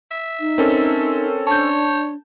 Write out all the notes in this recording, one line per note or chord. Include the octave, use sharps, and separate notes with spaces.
E5
D#4
C4 C#4 A4 A#4
D4 C#5 A5 G6